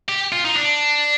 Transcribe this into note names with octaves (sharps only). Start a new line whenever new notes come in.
G4
F4
D#4
D4